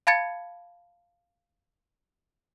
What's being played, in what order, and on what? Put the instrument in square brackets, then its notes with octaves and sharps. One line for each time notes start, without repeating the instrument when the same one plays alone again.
[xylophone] F5 A5 B5 G#6 A6 C#7